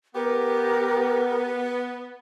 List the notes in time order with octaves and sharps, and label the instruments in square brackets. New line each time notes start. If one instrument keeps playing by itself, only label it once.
[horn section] B3 [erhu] G4 [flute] A#4